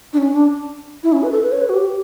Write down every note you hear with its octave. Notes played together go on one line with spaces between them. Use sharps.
D4
C#4
D4
E4
C#4
B4
A4
B4
C#5
B4
F#4
G4